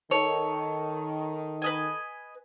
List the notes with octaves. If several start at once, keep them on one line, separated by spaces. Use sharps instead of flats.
D#3 A4 C#5
B4 D#5 G#5